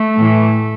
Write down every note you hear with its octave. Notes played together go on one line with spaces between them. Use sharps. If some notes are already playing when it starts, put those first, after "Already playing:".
Already playing: A3
A2 E3